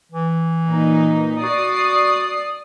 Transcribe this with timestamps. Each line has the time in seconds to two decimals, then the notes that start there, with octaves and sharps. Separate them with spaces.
0.12 E3
0.66 A#2 D#4
1.43 F#4 D5 D#6 C7